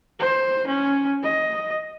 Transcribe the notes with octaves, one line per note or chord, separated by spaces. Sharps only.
C5
C#4
D#5